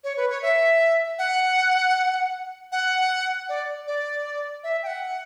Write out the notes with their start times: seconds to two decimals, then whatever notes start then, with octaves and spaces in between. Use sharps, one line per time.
0.04 C#5
0.17 B4
0.30 C#5
0.42 E5
1.19 F#5
2.72 F#5
3.49 D5
3.87 D5
4.64 E5
4.83 G5
4.87 F#5